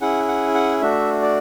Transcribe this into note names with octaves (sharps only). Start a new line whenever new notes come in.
C#4 E4 G#4 F#5
F#5
F#5
A3 D4 F#4 E5
D5